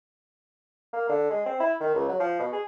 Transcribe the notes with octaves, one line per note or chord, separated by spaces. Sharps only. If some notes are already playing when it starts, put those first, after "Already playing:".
A#3
D3
G#3
C4
E4
D#3
C#2
F#3
F3
B2
G#4